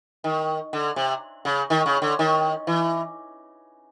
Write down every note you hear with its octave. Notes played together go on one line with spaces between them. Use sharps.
D#3
D3
C3
C#3
D#3
C#3
D3
D#3
E3